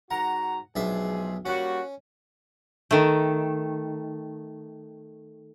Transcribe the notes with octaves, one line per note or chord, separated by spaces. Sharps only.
G#2 F#4 F#5 A#5
B1 F3 G#3 D4 G#4 E5
G3 A#3 C#4 F#4
D#3 A3